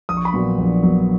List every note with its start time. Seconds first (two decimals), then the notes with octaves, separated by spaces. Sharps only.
0.09 A#1 D#6
0.17 C#6
0.25 B5
0.33 A#2 F#3 B3 C#6
0.59 A#1
0.83 A#2 F#3 B3